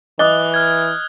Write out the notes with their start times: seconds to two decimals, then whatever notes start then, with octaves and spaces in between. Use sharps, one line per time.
0.19 E3 D#5 D6 D#6 F#6 G7
0.54 F6 G#6